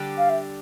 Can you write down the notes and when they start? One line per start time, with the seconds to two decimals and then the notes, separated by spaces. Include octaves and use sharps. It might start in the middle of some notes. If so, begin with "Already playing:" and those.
Already playing: D3 G3 D4 G4
0.18 F5
0.29 E5